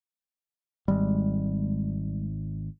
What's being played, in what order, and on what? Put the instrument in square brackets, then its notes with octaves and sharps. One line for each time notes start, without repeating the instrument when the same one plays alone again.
[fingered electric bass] G#1 [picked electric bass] G3 G#3